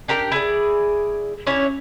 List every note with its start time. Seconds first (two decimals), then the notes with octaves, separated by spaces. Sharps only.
0.08 D4 G4 A#4 G5
0.32 E4 G#4 D5
1.47 C#4 D4 E4 C#5